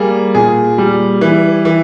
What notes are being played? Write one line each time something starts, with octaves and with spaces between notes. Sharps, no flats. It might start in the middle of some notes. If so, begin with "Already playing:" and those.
Already playing: G3 A#3 G#4
A#2 G#4
G3
E3
E3